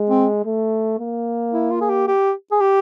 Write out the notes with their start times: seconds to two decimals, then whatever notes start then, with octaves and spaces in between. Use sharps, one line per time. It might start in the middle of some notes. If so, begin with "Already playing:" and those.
Already playing: G#3
0.10 C4
0.45 A3
0.99 A#3
1.53 E4
1.71 F4
1.81 G#4
1.89 G4
2.08 G4
2.51 G#4
2.61 G4